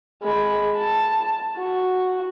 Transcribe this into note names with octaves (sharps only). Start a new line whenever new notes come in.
G#3 B5
A5
F#4